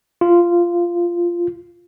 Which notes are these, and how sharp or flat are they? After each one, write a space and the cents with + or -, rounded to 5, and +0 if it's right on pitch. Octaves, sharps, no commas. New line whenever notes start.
F4 -10